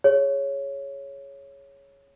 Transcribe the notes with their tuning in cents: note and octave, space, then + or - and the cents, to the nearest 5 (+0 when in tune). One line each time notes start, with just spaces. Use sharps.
G#4 +0 C#5 +0